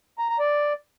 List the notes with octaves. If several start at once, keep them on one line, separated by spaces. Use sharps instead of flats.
A#5
A#5
D5